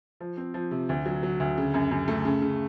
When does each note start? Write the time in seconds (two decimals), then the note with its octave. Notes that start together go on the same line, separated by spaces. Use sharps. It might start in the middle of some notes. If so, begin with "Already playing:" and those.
0.21 F3
0.37 C4
0.54 F3
0.71 C3
0.89 D2
1.06 F#3
1.23 F#3
1.40 D2
1.58 C#3
1.74 F#2
1.91 F#2
2.08 A3
2.25 C#3
2.42 C#3